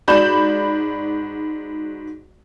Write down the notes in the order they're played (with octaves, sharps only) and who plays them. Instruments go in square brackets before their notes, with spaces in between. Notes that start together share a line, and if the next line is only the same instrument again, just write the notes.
[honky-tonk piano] G#2 F#4 D5 B5 G6 E7